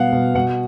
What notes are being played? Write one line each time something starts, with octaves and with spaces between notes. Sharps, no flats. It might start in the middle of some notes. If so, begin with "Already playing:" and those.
Already playing: B2 G3 B3 F5 F#5
B2
B2 F#5